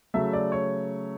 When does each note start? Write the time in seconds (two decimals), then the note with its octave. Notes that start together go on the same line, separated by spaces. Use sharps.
0.14 C#3 F#3 A3 E5
0.33 D5
0.52 C#5